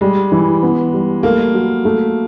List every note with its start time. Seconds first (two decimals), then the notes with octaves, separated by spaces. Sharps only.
0.01 G3 G#3
0.32 E3
0.63 B3
0.93 G3
1.23 A3 A#3
1.54 F#3
1.85 A3